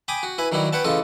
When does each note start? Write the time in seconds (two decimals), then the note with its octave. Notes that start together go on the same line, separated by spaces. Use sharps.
0.08 G5 G#5 B5 D6 D#6
0.23 F#4
0.38 E4 B4 G#5 B5
0.52 D#3 F#3 G3 E4 F#4
0.73 B4 C#5 F#5 G5 A5
0.84 A1 C#3 F4 A4 D#5